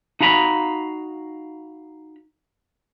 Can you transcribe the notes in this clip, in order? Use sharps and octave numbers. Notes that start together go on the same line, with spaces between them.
D#4 F#4 F5 A#5 B5